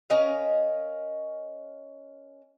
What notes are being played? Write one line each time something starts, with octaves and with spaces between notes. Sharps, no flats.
C#4 A#4 D#5 F5